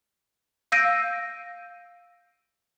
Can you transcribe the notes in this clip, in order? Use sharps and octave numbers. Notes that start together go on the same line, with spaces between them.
F5 E6 G6 A#6 D7 D#7